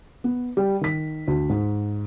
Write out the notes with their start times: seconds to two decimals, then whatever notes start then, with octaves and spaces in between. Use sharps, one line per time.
0.24 B3
0.57 G3
0.81 D#3 B6
1.27 D2
1.50 G#2